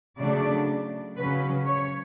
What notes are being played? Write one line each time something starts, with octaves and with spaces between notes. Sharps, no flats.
C#3 F#3 A3 D4 D5
C#3 F#3 C#4 B4
C#5